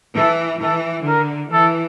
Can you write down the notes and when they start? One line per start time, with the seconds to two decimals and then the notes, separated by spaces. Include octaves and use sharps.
0.16 E3 A4
0.61 E3 A4
1.07 D3 A#4
1.52 E3 A4